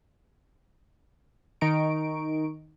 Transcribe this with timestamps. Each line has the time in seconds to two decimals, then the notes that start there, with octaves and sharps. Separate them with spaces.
1.61 D#3 D#4 A#5 C#6 D7